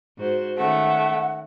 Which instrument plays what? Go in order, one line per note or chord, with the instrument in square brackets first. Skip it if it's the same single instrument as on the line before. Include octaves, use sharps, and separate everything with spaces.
[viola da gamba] G#2 F#4 C5
[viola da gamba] D#3 C#4 [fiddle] A3 [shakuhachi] F#5